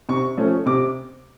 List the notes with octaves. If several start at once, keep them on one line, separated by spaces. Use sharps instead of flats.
C3 C#6
F3 A3 C#4
C3 D6